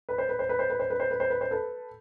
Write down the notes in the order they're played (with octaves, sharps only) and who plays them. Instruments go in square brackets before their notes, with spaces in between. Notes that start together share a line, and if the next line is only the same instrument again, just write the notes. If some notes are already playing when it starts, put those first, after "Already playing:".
[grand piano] B4
C5
B4
C5
B4
C5
B4
C5
B4
C5
B4
C5
B4
C5
A4 B4